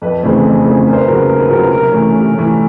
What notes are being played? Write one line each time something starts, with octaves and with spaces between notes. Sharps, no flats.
F2 B4
C#3 E3 A3 C4
F2
C#3 E3 A3 C4
D#2 A#4
C5
B4
C#3 F#3 A#4
B4
D#2 A#4
B4
C#3 F#3 A#4
B4
C3 A#4
E3 A3 C#4
C3
E3 A3 C#4